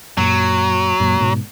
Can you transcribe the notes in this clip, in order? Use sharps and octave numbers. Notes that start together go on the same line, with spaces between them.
F#2 A#2 F#3
F#2 A#2
G#2 B2